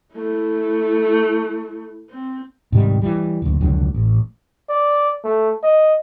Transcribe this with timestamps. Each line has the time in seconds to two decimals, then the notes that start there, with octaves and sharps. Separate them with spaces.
0.14 A3 E4
2.10 C4
2.72 G#2 C3 D#3 G3
3.01 E3 G3
3.42 F#1 D2
3.61 F1 C#2 D3 F#3
3.94 A1
4.69 D5
5.24 A3
5.63 D#5